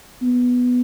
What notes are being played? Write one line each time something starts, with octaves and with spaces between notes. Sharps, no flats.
B3